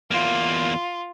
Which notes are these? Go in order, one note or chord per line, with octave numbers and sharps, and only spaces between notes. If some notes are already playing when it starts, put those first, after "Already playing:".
E2 A#3 F4